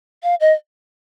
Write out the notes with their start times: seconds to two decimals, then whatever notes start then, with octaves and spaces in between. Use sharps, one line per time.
0.23 F5
0.41 D#5